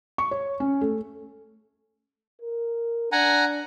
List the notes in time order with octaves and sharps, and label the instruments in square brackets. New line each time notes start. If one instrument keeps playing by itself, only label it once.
[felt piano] C#6
C#5
C#4
A3
[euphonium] A#4
[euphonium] D4 [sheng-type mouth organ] F#5 G#5 A#5